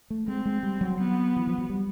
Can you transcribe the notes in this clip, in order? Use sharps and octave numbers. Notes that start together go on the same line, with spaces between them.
A3
G#3 C4
G#3
G3
F#3
B3
E3
F3
F#3
G3